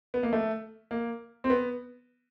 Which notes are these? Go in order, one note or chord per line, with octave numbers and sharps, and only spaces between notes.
B3
A#3
A3
A#3
C4
B3